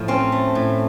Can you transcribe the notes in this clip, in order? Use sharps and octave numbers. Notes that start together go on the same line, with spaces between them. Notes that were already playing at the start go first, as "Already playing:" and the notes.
Already playing: A2 F3 A3
C4 C#4
A3
A2